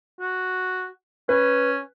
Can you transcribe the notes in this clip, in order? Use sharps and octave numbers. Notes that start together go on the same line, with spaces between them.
F#4
C#4 B4